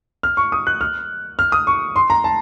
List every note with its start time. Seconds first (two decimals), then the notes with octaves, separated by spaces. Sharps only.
0.23 F6
0.37 C#6
0.52 D#6
0.67 F#6
0.81 F6
1.39 F6
1.52 D#6
1.67 C#6
1.96 C6
2.10 A#5
2.24 A5